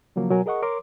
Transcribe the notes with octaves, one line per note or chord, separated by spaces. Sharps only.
C#3 F3 F#3 A#3
B2 F#3 A#4 G#5
G#4 A#4 D#5 F#5 C#6
A#4 C#5 C6 D6